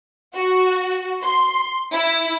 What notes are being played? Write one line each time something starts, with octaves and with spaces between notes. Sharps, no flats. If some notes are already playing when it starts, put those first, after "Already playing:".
F#4
C6
E4